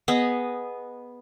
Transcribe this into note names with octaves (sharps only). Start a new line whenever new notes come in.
B3 G#4 D#5